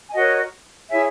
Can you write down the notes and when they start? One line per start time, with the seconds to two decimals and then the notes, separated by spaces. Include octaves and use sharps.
0.08 G#5
0.14 F#4 A#4 C#5 D#5 F#5
0.90 E4 G#4 C#5 E5 G#5